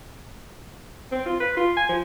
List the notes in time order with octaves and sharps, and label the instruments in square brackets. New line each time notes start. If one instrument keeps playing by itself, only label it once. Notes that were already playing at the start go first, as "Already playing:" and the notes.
[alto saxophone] C4
F4
B4
F4
G#5
F3